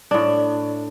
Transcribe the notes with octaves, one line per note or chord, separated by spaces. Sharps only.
A2 D4